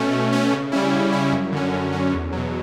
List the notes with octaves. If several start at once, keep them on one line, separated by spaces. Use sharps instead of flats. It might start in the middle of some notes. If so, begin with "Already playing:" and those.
Already playing: B2 A3 C#4
B2
A3 C#4
C#3
G3 C#4 E4
C#3
G3 C#4 E4
F#2
D3 F#3 C#4
F#2
D3 F#3 C#4
E2
B2 F#3